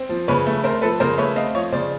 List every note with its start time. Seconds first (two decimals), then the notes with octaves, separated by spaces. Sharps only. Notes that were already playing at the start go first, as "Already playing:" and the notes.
Already playing: C4
0.09 F3
0.28 C#3 B4 C#5
0.46 A3
0.63 C4 A#4 C5
0.82 F3 A4 B4
1.00 C#3 A#4 C5
1.18 A3 B4 C#5
1.36 C4 D#5 F5
1.55 F3 C#5 D#5
1.72 C#3 C5 D5